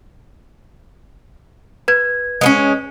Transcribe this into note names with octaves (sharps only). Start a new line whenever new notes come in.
B4 G#6
G#3 B3 C#4